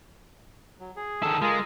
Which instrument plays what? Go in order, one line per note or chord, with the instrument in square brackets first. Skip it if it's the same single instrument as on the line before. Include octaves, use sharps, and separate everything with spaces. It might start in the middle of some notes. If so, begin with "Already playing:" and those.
[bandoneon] F#3
G#4
[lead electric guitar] D#3 A4
[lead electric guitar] G#3 [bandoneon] F4 G#4 A#4